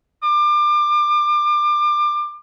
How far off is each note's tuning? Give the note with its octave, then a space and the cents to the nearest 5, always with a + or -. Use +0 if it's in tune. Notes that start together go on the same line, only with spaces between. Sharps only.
D6 +30